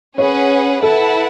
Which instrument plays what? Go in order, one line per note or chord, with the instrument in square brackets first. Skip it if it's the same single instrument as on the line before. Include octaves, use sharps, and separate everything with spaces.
[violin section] C#4 G#4 B4 F#5 [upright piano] C#5
[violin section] E4 B4 F#5 A5 [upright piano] A4